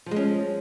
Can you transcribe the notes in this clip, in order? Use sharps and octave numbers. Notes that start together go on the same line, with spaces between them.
F3 G#3 C#4